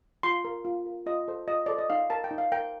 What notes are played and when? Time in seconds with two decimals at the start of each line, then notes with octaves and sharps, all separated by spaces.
0.23 F4 C6
0.45 A#4
0.65 F4
0.86 A#4
1.06 F4 D#5
1.28 A4 C5
1.47 F4 D#5
1.66 A4 C5 D5
1.78 D#5
1.90 D#4 F5
2.10 A#4 A5
2.24 G5
2.31 D#4
2.38 F5
2.52 A#4 G5